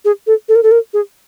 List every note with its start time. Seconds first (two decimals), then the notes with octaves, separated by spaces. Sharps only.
0.05 G#4
0.27 A4
0.49 A4
0.56 A#4
0.63 A4
0.72 A#4
0.94 G#4